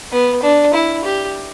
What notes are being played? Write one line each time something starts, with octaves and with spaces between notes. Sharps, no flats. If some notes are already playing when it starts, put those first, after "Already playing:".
B3
D4
E4
G4